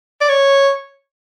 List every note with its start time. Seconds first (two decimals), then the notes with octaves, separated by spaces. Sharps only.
0.21 D5
0.29 C#5